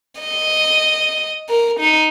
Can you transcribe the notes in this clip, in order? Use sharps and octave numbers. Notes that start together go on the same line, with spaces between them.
D#5
A#4
D#4